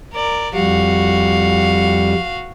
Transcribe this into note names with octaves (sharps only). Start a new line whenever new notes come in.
A#4 D5
F2 G3 F#4 F5